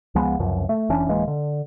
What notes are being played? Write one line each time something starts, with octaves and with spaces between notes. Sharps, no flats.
C#2 F3 G#3 B3
C#2 F#2 C3 F3
A3
F1 E3 C#4 D4
D1 E3 G#3 A#3
D3